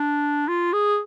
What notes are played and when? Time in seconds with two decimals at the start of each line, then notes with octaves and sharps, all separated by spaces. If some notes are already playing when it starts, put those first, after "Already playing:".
Already playing: D4
0.48 F4
0.73 G#4